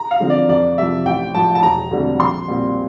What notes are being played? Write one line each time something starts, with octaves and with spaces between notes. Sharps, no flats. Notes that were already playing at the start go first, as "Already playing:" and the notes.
Already playing: A#5
F5
D3 F3 C4
D5
F2 D5
C3 F3 E5
A1 G5
A2 F3 A5
A5
E1 A#5
D2 D3 G3 C4
A#1 C6
A#2 G3 C4